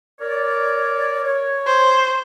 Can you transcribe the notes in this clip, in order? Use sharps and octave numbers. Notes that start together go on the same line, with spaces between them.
A#4 C#5 D5
C#5
C5